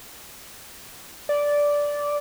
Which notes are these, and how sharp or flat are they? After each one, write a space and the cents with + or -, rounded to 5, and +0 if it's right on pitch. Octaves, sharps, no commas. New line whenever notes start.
D5 -10